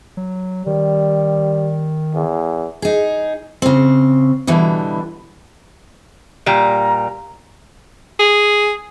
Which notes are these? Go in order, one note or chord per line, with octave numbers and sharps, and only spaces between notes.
F#3
D#3 G3
E2
D#4 G#4
C#3 C4
B2 D3 E3 G3
A#2 G3 A#5
G#4